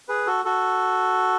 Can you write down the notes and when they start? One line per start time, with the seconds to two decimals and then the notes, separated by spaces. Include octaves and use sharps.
0.08 G#4 B4
0.27 F#4 A4
0.45 F#4 A4